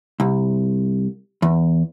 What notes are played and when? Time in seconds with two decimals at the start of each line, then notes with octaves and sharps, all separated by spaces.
0.20 C2
1.42 E2